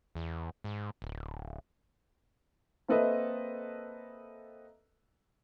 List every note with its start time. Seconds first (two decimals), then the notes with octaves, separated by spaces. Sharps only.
0.15 E2
0.64 G#2
1.02 D1
2.88 A#3 C4 A4 B4 D#5 E5